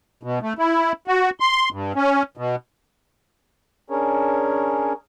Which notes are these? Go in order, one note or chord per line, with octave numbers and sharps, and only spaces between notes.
B2
A3
E4
F#4
C6
G2
C#4
B2
C#4 D4 G#4 A#4 C#5